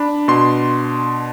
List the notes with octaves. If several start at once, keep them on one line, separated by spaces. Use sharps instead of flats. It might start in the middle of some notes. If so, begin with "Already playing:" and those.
Already playing: D4 B5
B2 C6